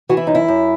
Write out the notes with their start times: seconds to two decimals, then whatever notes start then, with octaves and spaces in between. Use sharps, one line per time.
0.09 E3 F#4
0.17 E4
0.27 F#2 D#4
0.35 E4
0.48 F#2